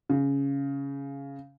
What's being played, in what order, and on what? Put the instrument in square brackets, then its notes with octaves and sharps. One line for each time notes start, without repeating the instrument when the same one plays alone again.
[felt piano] C#3